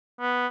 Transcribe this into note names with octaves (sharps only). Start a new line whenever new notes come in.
B3